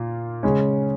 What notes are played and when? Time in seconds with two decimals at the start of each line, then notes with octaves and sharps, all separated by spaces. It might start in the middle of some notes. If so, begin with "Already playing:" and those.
Already playing: A#2 F4
0.43 C#3 G#3 C#4